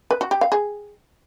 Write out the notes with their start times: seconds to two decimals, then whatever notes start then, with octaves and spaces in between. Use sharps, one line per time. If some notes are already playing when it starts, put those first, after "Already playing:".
0.11 B4
0.21 F#4
0.31 G4
0.41 F5
0.52 G#4